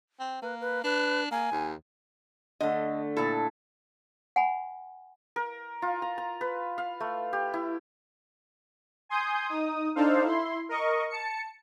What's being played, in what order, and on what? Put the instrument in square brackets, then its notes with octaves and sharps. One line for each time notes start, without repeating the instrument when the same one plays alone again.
[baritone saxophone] C4
[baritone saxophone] A#3 [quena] B4
[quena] B4
[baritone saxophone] D4 [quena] B4
[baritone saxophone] A#3 [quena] G#5
[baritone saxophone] D#2
[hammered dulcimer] D3 A3 [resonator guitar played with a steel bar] D#5
[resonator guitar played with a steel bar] A#2 A4 [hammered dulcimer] E4
[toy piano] F#5 G#5 B5
[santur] A#4
F4
A#5
A#5
B4
F5
A3
G4
E4
[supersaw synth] G#5 C6 D#6 G6
D#4 D#6
D4 D#4 A4 C5 F5
E4 C6
A#4 D#5 C#6
A5 C#7